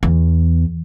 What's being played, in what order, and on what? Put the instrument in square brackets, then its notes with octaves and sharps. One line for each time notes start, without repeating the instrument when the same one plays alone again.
[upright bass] E2